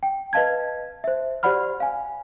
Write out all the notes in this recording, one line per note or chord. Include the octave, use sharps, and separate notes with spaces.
G5
B4 D#5 F5 A5 G#6
C5 E5
G4 C5 D5 F#5 B5 F6
F5 G#5